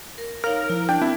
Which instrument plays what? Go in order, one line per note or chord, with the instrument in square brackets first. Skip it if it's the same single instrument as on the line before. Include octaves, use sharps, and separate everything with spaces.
[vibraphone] A#4
[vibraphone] D#4 C#5 F5 [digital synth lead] A#4
[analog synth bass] F3 [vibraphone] E4
[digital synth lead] D4 [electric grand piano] G5
[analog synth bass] C4 [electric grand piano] E4